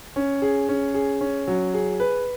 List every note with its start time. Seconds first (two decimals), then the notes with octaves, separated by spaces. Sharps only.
0.16 C#4
0.42 G#4
0.69 C#4
0.95 G#4
1.21 C#4
1.48 F#3
1.74 G#4
2.00 B4